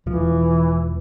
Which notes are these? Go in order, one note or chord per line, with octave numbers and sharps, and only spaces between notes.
E1 E3 F3